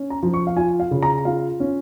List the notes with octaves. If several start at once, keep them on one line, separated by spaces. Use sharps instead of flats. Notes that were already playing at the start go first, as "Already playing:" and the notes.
Already playing: C#4
A#5
F3
C#6
F5
F4 G#5
F5
C#3
A#5
F4 F5
C#4